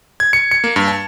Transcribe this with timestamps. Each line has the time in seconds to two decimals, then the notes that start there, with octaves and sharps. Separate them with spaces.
0.20 G#6
0.33 C#7
0.51 C#7
0.64 A#3
0.76 G2
0.88 A5